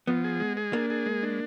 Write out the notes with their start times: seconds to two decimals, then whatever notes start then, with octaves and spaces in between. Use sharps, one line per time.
0.07 F3 B3
0.24 G#4
0.40 G#3
0.57 G#4
0.73 A#3 D4
0.90 G#4
1.06 G#3
1.23 D4